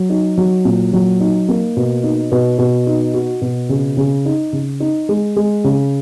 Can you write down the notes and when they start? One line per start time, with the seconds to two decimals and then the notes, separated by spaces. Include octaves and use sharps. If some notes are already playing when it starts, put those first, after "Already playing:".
Already playing: F#3
0.10 D#4
0.37 F#3
0.65 A#2
0.93 F#3
1.20 D#4
1.49 A#3
1.77 B2
2.03 D#4
2.32 B2
2.58 B2
2.87 D#4
3.14 F#4
3.41 B2
3.69 C#3
3.97 C#3
4.25 D#4
4.53 C#3
4.80 D#4
5.09 G#3
5.36 G#3
5.64 C#3